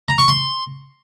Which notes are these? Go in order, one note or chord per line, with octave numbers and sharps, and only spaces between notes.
A#5
C#6
C6